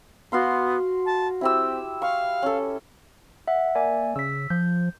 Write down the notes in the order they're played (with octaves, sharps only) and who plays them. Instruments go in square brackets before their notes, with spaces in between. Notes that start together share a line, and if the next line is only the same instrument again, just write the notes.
[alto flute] B3 [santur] F#4 F5 C6
[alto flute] A5
[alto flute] C4 [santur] E4 G4 E6
[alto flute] F5 [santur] C#6
[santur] C#4 A4
[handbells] E5 F#5
[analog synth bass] A#3 [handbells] D5 E5 G#5
[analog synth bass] C#3 [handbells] E6 B6
[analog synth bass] F3 [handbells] G6